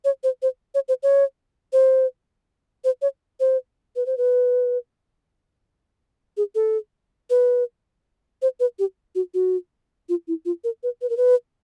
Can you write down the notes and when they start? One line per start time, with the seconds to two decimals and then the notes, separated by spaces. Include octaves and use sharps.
0.05 C#5
0.24 C5
0.42 C5
0.75 C#5
0.88 C5
1.03 C#5
1.73 C5
2.84 C5
3.02 C#5
3.40 C5
3.96 B4
4.06 C5
4.18 B4
6.37 G#4
6.55 A4
7.30 B4
8.42 C5
8.60 B4
8.79 G4
9.15 F#4
9.34 F#4
10.09 F4
10.28 E4
10.45 F4
10.64 A#4
10.83 B4
11.02 B4
11.10 A#4
11.17 B4